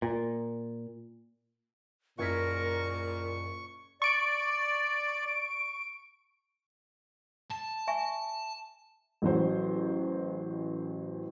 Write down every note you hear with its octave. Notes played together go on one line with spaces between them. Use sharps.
A#2
F#1 A#2 A#4 C#6 G#6 B6
D5 C#6 D7
A5
E5 G#5 C#6
A1 F#3 C5